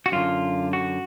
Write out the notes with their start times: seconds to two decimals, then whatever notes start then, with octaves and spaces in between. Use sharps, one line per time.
0.06 F#4
0.12 F#2 D3 F4
0.73 F#4